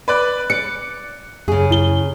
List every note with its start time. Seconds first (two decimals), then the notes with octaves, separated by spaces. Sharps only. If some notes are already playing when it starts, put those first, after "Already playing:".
0.08 B4 D5 F#6
0.50 D5 C#7
1.48 F#2 C#3 G#4
1.71 F#2 E4 G7